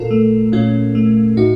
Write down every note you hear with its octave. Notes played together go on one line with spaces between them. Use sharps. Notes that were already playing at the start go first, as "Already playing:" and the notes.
Already playing: A#2 F4 A4 A#4
A3
A#2 C#4 F4
A3
A2 D#4 F#4